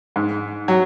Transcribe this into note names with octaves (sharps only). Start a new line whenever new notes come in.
G#2
F#3